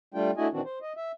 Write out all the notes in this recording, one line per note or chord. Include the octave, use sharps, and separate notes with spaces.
G3 A3 D4 F4 G5
A3 D4 E4 F#4 D#5 G#5
A#2 D#3 E3 C4 D4 F#4
C5
D#5
E5